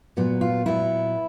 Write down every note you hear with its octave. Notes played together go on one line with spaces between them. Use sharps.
A#2 F#3 B3
F4
A#2 F#3 B3 E4